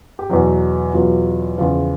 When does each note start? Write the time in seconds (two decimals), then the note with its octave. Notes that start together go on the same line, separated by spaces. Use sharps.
0.19 G4
0.30 E2 B2 F#3 F#4
0.94 E2 B2 F#3 F4
1.58 E2 C#3 F3 F4